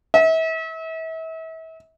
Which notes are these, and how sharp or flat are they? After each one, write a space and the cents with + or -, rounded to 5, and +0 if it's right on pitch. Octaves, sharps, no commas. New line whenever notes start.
E5 -35